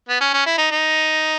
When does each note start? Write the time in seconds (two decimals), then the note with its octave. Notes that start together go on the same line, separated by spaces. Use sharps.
0.09 B3
0.21 C#4
0.34 C#4
0.46 E4
0.58 D#4
0.71 D#4